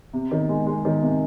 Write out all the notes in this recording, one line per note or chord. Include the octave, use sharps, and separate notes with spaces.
C3
D#3
G#3
G#3
D#3
C3